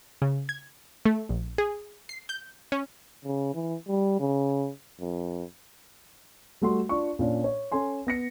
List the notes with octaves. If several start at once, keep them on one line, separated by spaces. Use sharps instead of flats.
C#3
G#6
A3
A#1
G#4
C7
G6
C#4
C#3
E3
G3
C#3
F2
G3 A3 F#4 C6
D4 F4 C#6
A#2 C#4 D4
C#5
C#4 A4 G#5 C6
B3 A#6 C#7